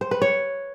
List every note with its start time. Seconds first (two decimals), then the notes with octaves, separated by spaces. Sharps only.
0.01 C5
0.11 B4
0.22 C#5